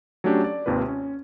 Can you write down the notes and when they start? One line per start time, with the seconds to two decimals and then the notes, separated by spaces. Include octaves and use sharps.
0.24 F#3 A3 C#4 D4 G4
0.44 D5
0.66 G#1 D#2 C3 F4 B4
0.88 C#4